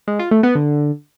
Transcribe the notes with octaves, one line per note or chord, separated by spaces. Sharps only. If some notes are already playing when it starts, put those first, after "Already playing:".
G#3
F4
A3
B3
D3